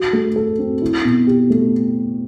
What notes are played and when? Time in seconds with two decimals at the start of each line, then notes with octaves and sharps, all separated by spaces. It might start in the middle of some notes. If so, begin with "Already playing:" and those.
Already playing: F#4
0.13 A3
0.36 A4
0.59 C4
0.82 E4
1.05 B2
1.27 G4
1.50 A3